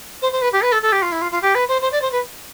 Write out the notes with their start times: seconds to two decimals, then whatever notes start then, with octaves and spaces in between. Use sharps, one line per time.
0.22 C5
0.32 C5
0.42 B4
0.52 G4
0.62 B4
0.72 A4
0.82 A4
0.92 G4
1.02 F4
1.12 E4
1.21 F4
1.32 F4
1.42 G4
1.55 B4
1.68 C5
1.82 C5
1.92 D5
2.02 C5
2.12 B4